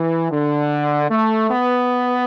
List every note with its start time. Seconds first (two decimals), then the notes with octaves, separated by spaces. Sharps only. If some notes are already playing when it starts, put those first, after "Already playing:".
Already playing: E3
0.31 D3
1.10 A3
1.49 B3